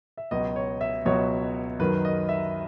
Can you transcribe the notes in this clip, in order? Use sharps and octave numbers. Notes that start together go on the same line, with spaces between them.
E5
C#2 B2 F#3 D#5
C#5
E5
C#2 B2 F#3 C#5
F#2 D#3 F#3 B4
D#5
E5